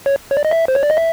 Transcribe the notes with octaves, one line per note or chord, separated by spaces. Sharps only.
C#5
C#5
D5
D#5
E5
C5
C#5
D5
D#5
E5